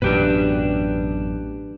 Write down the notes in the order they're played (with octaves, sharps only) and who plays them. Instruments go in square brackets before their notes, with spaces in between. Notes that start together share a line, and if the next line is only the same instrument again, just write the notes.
[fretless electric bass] A1 F#2 B2 [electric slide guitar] D4 G4 B4